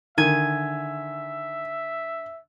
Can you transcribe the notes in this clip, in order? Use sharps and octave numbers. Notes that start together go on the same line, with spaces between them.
D3 D#3 E5 G#5 G#6 D#7